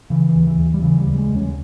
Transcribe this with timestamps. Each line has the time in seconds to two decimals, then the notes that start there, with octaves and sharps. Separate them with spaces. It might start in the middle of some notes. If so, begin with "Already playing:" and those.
0.10 C#3 E3
0.29 E3
0.35 D#2
0.47 E3
0.58 D#2
0.74 G3
0.82 C#3 E3
1.00 G3
1.07 D#2
1.13 G3
1.18 G#3
1.30 D#2
1.36 C#4